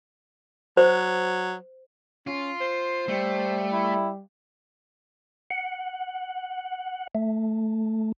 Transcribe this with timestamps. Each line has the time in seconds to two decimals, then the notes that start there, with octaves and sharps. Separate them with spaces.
0.77 F#3 C5
2.27 C#4 F4
2.61 C5
3.08 G3 A3
3.73 E4
5.51 F#5
7.15 A3